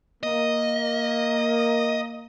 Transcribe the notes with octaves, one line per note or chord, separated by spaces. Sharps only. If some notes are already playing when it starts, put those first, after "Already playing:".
A#3 D#5